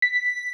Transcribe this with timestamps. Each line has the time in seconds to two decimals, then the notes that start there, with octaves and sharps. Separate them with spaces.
0.02 B6